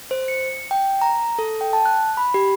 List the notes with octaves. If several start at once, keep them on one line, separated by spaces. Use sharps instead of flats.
C5
C#7
G5
A#5
A4
G5
A5
F#6
B5
G4